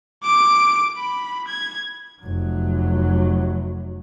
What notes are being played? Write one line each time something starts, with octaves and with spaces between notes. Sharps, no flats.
D6 D7
B5
G#6
F1 F#3